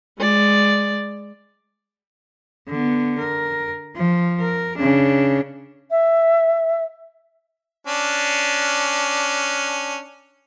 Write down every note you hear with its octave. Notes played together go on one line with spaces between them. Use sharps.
G#3 D5
D3 B3
A#4
F3
A#4
C#3 D4
E5
C#4 D4